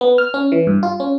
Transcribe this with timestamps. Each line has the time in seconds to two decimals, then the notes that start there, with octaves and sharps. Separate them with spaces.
0.01 B3
0.18 F6
0.34 C#4
0.52 E3
0.67 G2
0.83 F4
1.00 C#4